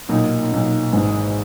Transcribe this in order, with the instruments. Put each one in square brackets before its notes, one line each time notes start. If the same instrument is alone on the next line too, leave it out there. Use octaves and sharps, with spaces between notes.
[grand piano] B1 A#2 A#3 D#4
B1 A#2 A#3 D#4
G#1 G#2 E3 G#3